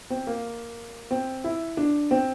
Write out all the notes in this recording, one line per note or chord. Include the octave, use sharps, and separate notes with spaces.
C4
A#3
C4
E4
D4
C4